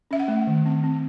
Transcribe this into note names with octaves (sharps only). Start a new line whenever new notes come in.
C#4 E5
F#5
A3
D#3
C4
C4